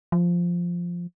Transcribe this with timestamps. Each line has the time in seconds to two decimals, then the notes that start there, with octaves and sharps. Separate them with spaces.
0.12 F3